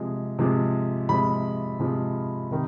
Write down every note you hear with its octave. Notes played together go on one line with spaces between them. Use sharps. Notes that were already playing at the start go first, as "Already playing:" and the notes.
Already playing: C3 F3 G#3
C3 F3 G#3
C3 F3 G#3 B5
C3 F3 G#3
C3 D#3